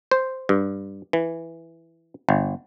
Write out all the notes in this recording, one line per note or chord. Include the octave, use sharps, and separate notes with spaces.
C5
G2
E3
G1